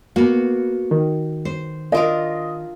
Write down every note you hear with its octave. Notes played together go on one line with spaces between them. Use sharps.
A#3 B3 F#4
D#3
C5
D4 F4 A#4 D#5